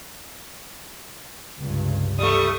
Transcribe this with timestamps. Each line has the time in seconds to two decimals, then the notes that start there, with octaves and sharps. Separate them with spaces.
1.58 C#2 G2 C3
2.19 G3 A3 C#6 D#6